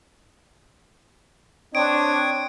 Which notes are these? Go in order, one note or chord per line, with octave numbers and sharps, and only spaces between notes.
C4 D4 C#5 D#6 D7